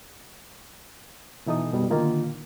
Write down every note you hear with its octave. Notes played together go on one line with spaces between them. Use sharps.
B2 E3 D#4 A4 D#6
F#2 B2 G3
A#2 D3 D#3 A#3 D#4 F4